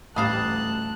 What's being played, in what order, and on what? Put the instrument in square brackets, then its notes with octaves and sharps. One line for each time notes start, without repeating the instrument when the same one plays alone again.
[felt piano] A1 D#6 [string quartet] D2 F#6 [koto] G3 F5 A#5 [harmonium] A5